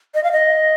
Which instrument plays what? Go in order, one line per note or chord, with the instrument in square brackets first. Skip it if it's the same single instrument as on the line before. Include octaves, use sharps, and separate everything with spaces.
[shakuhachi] D#5
F5
D#5